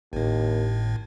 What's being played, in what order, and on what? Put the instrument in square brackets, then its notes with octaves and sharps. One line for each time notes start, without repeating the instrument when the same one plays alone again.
[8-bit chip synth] G#1 A2 [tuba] D#2